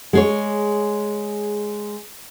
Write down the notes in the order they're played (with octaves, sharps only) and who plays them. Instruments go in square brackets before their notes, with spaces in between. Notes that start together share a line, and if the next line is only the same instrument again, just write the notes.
[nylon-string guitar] G#3 G#4 C#5